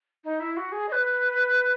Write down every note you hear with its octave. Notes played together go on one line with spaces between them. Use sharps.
D#4
E4
F#4
G#4
D#5
B4